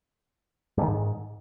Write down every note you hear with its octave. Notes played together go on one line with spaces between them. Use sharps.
G2
D#3
G#2